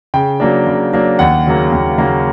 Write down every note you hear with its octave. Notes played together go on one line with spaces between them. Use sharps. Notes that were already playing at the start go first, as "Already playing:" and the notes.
C#3 G5
F#3 A#3 D4
C#3
F#3 A#3 D4
D#2 F#5
C#3 F#3 A#3
D#2
C#3 F#3 A#3